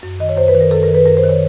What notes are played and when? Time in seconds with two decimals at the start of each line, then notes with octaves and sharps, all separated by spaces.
0.03 F#2
0.20 D#3 D#5
0.29 C#5
0.37 F#2 C5
0.48 B4
0.55 D#3
0.61 A#4
0.71 F#2 A4
0.83 A#4
0.88 D#3
0.95 B4
1.06 F#2 A#4
1.17 C5
1.23 D#3
1.29 C#5